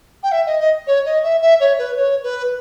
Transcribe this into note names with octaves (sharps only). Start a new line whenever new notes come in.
G5
E5
D#5
D#5
C#5
D#5
E5
E5
C#5
B4
C#5
B4